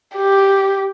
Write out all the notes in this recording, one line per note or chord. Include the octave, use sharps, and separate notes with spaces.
G4